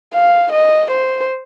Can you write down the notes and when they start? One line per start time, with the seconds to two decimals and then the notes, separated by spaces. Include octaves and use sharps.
0.14 F5
0.52 D#5
0.90 C5